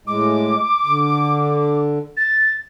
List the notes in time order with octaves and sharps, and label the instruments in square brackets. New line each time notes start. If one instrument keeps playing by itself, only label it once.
[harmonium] A2 G#3 [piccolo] D6
[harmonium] D3
[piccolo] A6